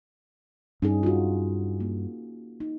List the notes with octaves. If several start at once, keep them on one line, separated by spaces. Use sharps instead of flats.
G2 C#4 D#4 G#4
F4 F#4
A#3
D#4